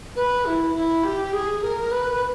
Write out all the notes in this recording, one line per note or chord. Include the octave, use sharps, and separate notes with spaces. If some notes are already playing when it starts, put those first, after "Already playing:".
B4
E4
E4
G4
G#4
A#4
B4